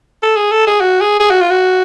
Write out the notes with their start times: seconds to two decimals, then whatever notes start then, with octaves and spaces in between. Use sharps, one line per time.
0.23 A4
0.36 G#4
0.52 A4
0.67 G#4
0.81 F#4
1.01 G#4
1.20 G#4
1.30 F#4
1.41 F4
1.51 F#4